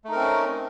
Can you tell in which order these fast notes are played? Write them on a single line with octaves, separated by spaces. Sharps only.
A3 D#4 A#4 C4 C#4